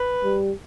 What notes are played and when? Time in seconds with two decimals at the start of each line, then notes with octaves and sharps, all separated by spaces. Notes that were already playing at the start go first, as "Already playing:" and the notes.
Already playing: B4
0.24 G3